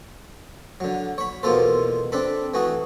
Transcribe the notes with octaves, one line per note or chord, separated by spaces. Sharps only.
D3 F#3
C#5 B5
E2 B2 A#3 F4 A4 C5
C4 D4 A4 B5
E3 A3 F#4 D#5